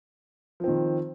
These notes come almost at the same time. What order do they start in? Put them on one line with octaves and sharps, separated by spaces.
F3 C4 D#3